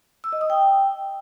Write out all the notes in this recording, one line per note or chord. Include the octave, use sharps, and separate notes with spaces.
E6
D#5
D#6
G5